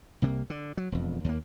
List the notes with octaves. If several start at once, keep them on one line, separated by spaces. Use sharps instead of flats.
C2 C3 A#3
D3
F#3
E1 F2
D#2 A#3